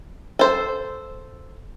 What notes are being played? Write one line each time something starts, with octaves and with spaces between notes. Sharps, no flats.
A4 C5